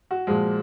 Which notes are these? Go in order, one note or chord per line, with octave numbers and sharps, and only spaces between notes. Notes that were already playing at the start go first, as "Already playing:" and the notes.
F#4
A#2 F3 G#3